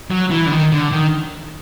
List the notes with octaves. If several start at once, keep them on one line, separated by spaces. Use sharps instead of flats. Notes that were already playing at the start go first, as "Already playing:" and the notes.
F#3
E3
D3
D#3
D3
D#3